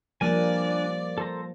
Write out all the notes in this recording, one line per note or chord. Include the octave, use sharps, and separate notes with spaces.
F3 G3 A#3 D4 A#4 D5 G#5
A4 C5 A#5